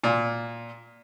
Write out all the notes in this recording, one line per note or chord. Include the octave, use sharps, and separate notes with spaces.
A#2